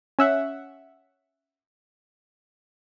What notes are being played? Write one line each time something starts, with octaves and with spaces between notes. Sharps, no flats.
C#4 E5 F#5